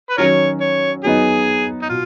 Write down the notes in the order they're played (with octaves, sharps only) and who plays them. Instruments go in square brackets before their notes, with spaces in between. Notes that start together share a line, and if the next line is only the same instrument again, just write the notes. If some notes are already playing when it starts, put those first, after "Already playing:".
[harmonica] B4
[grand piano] D#3 F#3 C#4 [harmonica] F4 A#4 C#5
[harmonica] C#5
[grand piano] F#3 B3 D#4 [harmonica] G#4
[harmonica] D#4
[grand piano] B2 [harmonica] F4